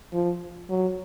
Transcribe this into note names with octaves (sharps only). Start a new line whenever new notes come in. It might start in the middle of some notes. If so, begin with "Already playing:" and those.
F3
F#3